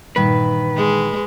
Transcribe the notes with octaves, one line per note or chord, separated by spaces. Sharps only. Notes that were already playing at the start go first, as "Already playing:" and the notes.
G2 A#2 D#3 E3 B4
G#3